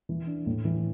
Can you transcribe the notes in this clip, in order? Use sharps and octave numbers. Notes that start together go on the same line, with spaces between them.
E3
D4
A2
E3